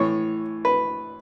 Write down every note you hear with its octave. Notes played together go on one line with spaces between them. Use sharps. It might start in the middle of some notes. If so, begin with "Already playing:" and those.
Already playing: A2 E3 C#5
B4